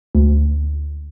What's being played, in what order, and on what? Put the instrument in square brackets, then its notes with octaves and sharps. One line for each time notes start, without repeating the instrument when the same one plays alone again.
[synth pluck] D2